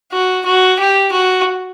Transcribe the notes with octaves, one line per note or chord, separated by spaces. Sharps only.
F#4
F#4
G4
F#4